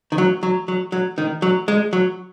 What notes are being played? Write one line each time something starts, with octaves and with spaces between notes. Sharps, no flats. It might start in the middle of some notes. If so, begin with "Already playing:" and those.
D#3
F#3
F#3
F#3
F#3
D#3
F#3
G#3
F#3